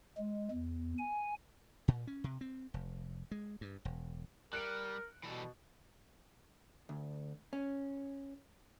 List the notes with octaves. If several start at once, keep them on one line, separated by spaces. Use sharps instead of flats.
G#3
E2
G#5
A#2
C#4
C3
C4
F1
G#3
G2
E1
G3 A#4 F#6 C#7 D7
B2 E3 G3 A4
D2
C#4